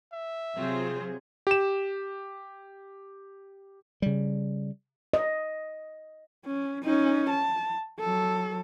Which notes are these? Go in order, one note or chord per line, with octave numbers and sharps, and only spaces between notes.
E5
C3 F#3 C4 F4 G#4 C5
G4 E7
C#3 G3
D#5
C#4
C#4 D#4
A5
F#3 A4